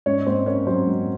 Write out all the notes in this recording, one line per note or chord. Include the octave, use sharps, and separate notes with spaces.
G#2 C#4 C#5
G#2 C4 C5
A#3 C#4 C#5
F#3 C4 C5
G#2